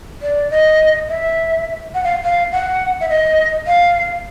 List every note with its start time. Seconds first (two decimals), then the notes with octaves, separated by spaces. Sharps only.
0.22 D5
0.51 D#5
1.09 E5
1.94 F#5
2.04 F5
2.23 F5
2.52 F#5
3.01 E5
3.09 D#5
3.67 F5